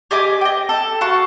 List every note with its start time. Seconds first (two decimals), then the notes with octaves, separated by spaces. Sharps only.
0.11 G4 D#5 G#5 D6
0.41 D#5 G5
0.69 A4
1.01 F#4 F5 A5 C#6